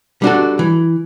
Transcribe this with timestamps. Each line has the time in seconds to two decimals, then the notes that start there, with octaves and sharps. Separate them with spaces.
0.22 G3 D4 F#4 A4
0.59 E3